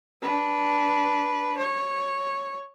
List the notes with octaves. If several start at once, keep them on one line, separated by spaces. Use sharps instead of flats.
D4 B4
C#5